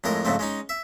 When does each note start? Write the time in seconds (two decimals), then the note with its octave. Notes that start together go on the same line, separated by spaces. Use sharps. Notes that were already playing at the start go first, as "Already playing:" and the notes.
0.04 F2 A2 G#3 A#4
0.25 F2 G#2 C#3 A3 C4
0.39 G#3 C#4 D#4
0.69 E5